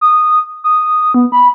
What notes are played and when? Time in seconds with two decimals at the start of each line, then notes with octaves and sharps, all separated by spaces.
0.01 D#6
0.64 D#6
1.14 B3
1.32 B5